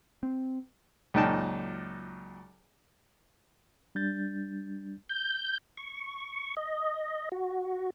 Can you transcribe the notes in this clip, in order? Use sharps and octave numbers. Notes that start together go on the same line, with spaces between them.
C4
C#2 F#2 A#2 D#4 G5 A5
G3 D4 G6 A6
G6
C#6
D#5
F#4